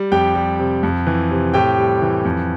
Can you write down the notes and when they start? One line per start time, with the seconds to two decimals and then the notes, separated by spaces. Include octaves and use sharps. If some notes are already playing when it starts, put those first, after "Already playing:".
Already playing: G3
0.12 F2 G4 G5
0.35 G3
0.59 C3
0.83 F2
1.07 E3
1.31 C3
1.54 A2 G4 G5
1.78 G3
2.02 E3
2.25 F2